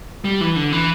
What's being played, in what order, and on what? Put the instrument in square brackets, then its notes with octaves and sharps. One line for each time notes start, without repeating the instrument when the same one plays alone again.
[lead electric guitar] G3
E3
D3
E3